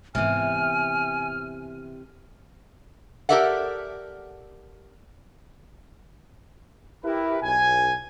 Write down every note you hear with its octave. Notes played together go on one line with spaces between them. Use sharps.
G#2 C3 E3 B3 G#5 F6
G4 A4 A#4 D5 E5 F#5
E4 G4 A#4 B4
B1 G#5